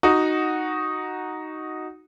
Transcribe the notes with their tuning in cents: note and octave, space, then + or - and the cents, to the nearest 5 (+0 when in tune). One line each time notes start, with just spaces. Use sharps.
D#4 +0 F#4 +0